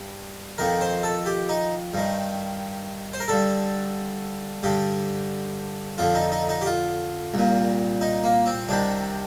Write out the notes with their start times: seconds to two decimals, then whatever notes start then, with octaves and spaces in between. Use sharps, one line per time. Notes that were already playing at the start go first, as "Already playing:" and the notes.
Already playing: G2
0.58 F2 D#3 A#4
0.81 C5
1.03 A4
1.26 G4
1.49 D#4
1.94 G2 D#3
3.13 C5
3.20 A#4
3.28 G2 D3 A4
4.63 G2 D3 G4
5.98 F2 D3 F4
6.15 D#4
6.32 D#4
6.49 D#4
6.61 G4
6.66 F4
7.34 C2 A#2
8.01 D#4
8.24 A#3
8.46 C4
8.69 C2 C3 D#3 D4